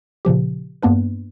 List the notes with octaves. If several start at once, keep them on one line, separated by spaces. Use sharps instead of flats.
A#2 C#3 F3 G4
G2 A#3 B3 D4 B4